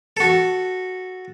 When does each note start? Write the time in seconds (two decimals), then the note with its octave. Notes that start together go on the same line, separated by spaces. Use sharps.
0.17 F#4 A4